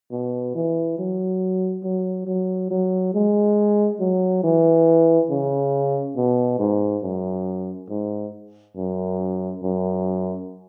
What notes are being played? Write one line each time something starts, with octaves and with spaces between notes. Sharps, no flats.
B2
E3
F#3
F#3
F#3
F#3
G#3
F#3
E3
C#3
B2
G#2
F#2
G#2
F#2
F#2